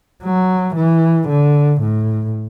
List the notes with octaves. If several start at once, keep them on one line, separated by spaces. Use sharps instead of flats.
F#3
E3
D3
A2